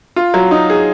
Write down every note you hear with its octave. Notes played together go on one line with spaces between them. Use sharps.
F4
F#3
D#4
G#4